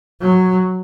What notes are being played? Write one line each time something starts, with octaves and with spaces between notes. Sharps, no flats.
F#3